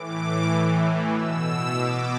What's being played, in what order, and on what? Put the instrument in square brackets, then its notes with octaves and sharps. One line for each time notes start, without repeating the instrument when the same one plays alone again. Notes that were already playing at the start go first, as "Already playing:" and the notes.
Already playing: [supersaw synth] A2 E3 D6
E3
A2
B2 E6
B2 D6